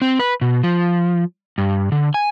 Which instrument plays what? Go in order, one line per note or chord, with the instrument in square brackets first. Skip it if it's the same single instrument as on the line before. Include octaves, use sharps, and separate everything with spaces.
[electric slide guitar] C4
B4
B2
F3
G2
D3
G#5